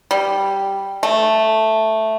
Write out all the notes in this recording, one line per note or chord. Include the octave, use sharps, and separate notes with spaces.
G3
A3